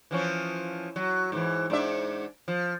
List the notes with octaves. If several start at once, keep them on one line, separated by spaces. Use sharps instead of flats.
E3 F3 C#4
F#3
G#2 E3
G#2 D4 E5
F3